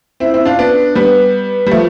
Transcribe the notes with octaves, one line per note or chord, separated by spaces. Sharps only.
C4 E4
C4 E4
D4 F4
B3 D4
G3 B3
G3
F3 A3